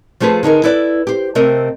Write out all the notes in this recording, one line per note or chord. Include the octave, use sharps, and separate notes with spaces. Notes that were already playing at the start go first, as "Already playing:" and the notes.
F3 A3 F4 G#4 B4
D3 D#4 G#4 A#4
E4 A4 B4 D5
G4 C5
C3 A3 C4 A#4 D#5